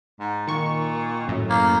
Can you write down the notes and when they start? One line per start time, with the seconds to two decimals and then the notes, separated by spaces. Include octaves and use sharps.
0.20 G#2
0.47 A#2 D#3 C#6
1.27 F#2 A2
1.50 A#3